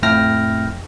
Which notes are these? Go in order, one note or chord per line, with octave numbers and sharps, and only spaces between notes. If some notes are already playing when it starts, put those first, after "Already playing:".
F2 A2 E4 G5 F6 A#6